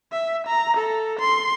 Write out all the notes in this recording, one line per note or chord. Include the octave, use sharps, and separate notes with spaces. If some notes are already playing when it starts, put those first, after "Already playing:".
E5
A#5
A4
C6